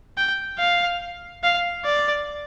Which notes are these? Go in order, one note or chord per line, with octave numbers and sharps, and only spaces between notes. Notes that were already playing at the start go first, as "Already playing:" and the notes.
G5
F5
F5
D5